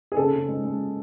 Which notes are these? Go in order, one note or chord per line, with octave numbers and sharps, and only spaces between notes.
G#4
C#3 A4
C#3
G#3
G#3